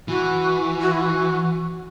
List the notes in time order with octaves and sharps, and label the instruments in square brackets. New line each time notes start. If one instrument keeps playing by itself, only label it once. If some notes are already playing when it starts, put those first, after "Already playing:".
[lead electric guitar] E3 [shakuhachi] F#4
[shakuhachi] F#4
E4
F#4